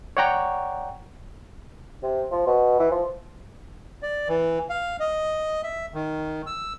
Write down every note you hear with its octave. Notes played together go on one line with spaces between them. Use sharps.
C#5 D5 F#5 G5 A#5 C#6
C3
F3
B2
E3
F3
D5
E3
F5
D#5
E5
D#3
E6